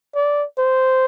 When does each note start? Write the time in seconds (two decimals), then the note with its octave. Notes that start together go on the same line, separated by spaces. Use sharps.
0.15 D5
0.58 C5